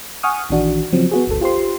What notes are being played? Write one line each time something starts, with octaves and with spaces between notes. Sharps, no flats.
F#5 G#5 C#6 D#6 F6
A#1 D#3 E3 D4 F#4
C#3 F3 F#3 C4
B3 F#4 G#4
G1 D2 A4
F4 G4 C5 C6